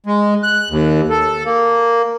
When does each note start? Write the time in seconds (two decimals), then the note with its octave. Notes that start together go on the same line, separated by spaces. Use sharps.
0.06 G#3
0.43 F#6
0.70 D#2
1.10 A4
1.45 A#3